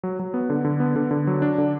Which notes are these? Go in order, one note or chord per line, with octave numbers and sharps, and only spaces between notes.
F#3
F#3
B3
D3
D3
B3
D3
D3
F#3
D4
D3